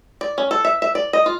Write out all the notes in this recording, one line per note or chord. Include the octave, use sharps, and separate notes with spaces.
D5
C#4
A4
E5
E5
D5
D#5
F4